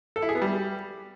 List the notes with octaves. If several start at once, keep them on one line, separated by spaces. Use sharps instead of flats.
A4
E4
G#4
B3
G3